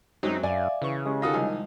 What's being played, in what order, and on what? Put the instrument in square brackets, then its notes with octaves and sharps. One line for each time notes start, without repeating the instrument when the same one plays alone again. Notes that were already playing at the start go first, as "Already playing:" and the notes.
[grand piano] F#2 [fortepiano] F#3 G#3 C4 [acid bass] D#4
[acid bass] F#2 [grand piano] D5 [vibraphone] E5 F5 [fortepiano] G#5
[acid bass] C#3 [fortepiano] E3 C#6
[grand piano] G#3 C#4 [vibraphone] G4
[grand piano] D#3 D#6 A#6 [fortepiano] F4 F#4 A4
[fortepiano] C2 F3 G#5 [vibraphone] G#3 D#5